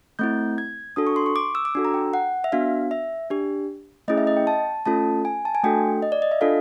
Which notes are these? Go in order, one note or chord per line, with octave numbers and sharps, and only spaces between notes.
A3 C4 E4 G6
G#6
D4 F#4 A4 D#6
C#6
C6
C#6
D6
E6
D6
D4 F#4 A4 E6
A#5
G5
F#5
E5
B3 D4 F#4 F5
E5
D4 G4
A3 C#4 E4 G#4 D#5
E5
D#5
G5
A5
A3 C#4 F4 A4 A5
G#5
A5
G#5
A3 D4 F#4 A4 G5
D#5
D5
D#5
E5
D4 F4 A4 F5